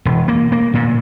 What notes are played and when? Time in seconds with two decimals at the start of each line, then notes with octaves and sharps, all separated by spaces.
0.05 E1
0.28 A#3
0.52 A#3
0.74 A#2